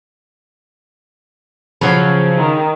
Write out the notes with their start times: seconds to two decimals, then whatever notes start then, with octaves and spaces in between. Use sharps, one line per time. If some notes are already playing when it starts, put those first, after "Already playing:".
1.81 C#3 F3 F#3 C#5 B5
2.36 D#3